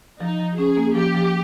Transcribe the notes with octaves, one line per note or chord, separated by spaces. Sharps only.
F3 D#4
F3
C#4 G#4
A#3
F3 G4
F3